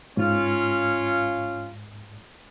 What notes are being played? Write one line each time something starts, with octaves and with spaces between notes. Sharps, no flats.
G#2 C#4 F4